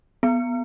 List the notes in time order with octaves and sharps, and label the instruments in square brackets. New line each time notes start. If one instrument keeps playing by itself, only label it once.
[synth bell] B3